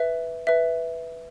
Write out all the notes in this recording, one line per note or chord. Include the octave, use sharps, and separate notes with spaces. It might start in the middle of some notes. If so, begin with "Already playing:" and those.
Already playing: B4 E5
B4 E5